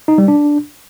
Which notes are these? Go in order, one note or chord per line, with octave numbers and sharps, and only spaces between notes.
D#4
G3
D4